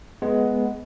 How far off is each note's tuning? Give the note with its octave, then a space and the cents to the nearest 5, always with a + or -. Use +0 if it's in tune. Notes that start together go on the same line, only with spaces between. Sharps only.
G#3 +15 B3 +0